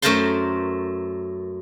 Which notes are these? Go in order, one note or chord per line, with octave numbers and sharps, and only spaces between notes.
F#2 A3 A#4 C5 A5 C6